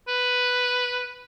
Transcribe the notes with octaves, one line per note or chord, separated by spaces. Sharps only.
B4